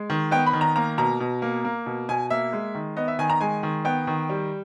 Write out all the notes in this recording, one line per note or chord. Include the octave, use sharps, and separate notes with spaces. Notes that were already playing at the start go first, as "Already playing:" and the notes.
Already playing: G#3
D#3
B3 G5
B5
D#3
A#5
A#3 A#5
B2 A#5
B2
A#3
A#3
B2
B2 G#5
A#3 E5
G#3
D#3
B3 D#5
E5
D#3 G#5
A#5
G#3 G#5
D#3
B3 G5
D#3
G3